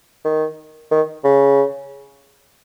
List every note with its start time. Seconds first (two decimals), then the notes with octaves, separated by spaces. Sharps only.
0.25 D#3
0.91 D#3
1.24 C#3